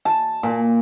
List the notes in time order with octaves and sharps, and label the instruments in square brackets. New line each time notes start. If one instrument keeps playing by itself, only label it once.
[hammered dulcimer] A5
A#2